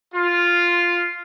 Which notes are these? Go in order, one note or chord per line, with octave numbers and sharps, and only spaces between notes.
F4